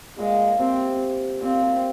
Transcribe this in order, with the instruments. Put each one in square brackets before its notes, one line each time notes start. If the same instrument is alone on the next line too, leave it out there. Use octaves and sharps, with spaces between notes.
[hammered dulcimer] A#2 [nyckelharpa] G#3
[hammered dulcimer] C3 [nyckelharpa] C4
[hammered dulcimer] A#2 [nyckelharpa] C4
[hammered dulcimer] C3